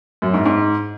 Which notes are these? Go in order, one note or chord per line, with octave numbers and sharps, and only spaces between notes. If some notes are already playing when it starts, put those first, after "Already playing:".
F#2
G#2
G#2